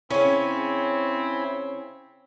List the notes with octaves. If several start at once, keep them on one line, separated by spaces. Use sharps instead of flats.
C#3 C4 C#4 E4 C#5 G#5 B5